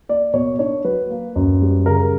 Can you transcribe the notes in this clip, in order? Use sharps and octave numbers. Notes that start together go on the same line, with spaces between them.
A#3 D5
B2 C#5
D4 C#5
F#3 B4
A#3
F#2
G3
C#3 A#4